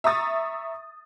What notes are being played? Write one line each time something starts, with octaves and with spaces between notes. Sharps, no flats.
E5 A#5 C#6 D#6 A6